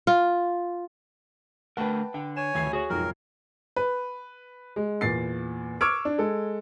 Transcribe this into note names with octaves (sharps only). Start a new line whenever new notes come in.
F4
D3 A3 A#4 B4 F#5 G5 A5
D3 G5
C#5 G#5 E7
D2 D#3 E3 G#6 C7
F#4 G#4 C#5
B1 F2 G#2 A#4
B4
G#3
E2 A#2 A6 C7
C#6 D6 E6 F6 G#6 D7
D4
G#3 A4